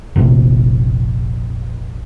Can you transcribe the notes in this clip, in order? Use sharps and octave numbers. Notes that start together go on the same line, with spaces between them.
F1 A#1 C3